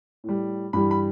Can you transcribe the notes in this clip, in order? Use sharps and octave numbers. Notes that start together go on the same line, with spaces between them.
A2 G3
G2 E3 G3 B5
B5